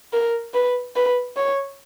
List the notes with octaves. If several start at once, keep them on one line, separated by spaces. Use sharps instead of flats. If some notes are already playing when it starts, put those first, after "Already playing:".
A#4
B4
B4
C#5